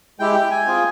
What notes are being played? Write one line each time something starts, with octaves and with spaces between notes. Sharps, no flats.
G#3 E4 G4 G5
G5
G#5
C4 F4 G#4